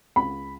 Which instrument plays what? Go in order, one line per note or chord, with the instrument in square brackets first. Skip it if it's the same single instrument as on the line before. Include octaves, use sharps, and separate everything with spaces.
[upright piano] C#2 B5